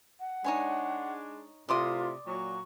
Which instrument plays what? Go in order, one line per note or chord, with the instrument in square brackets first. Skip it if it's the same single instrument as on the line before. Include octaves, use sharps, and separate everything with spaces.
[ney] F#5
[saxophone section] G#3 D4 [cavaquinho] D#4 C#5 G#5
[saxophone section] A2 C3 [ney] F4 [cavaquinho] D5 C6 D#6
[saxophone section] A#2 F#3 [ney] C#6